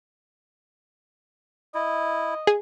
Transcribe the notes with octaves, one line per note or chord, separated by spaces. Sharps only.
E4 D#5
G#4